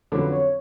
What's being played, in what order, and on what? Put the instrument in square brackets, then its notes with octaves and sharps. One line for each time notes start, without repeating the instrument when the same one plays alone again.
[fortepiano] F2 D3 F#3 C#4 F#4 [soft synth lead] B4
[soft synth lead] C#5